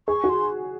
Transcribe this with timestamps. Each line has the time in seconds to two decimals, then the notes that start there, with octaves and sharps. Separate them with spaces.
0.08 G#4 C#6
0.24 F#4
0.29 C6